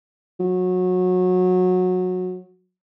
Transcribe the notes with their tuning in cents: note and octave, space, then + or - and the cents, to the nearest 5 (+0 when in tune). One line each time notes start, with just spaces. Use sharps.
F#3 -20